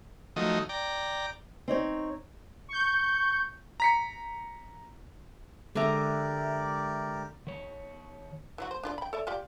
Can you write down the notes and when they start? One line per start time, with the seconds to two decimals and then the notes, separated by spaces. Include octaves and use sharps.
0.36 D#3 F3 F#3 A3 D#5
0.69 D5 G5 A#5
1.68 C4 D#4 C#5
2.69 C#6 G6
3.80 A#5 B6 C#7
5.75 D3 G#3 D4 G4 A#4 D5 E5 A#5
7.47 D#3 C#5
8.58 E3 F#3 F#4
8.71 C5
8.83 D4 F4 D5
8.98 G5 B5
9.13 A4 D5 E5
9.27 F4 G4 D5